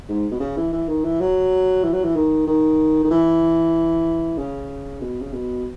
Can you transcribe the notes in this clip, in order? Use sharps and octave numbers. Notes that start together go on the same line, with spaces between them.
G#2
B2
C#3
E3
E3
D#3
E3
F#3
E3
F#3
E3
D#3
D#3
D#3
E3
C#3
B2
C#3
B2